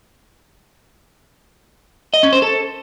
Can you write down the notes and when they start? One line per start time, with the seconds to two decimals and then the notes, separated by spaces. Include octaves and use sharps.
2.14 D#5
2.23 C#4
2.33 C5
2.42 A4